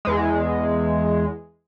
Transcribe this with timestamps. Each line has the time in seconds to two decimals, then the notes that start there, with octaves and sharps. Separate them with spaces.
0.05 E2 G#3